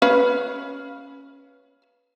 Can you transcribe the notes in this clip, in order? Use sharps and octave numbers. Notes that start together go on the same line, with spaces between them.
C#4 B4 F5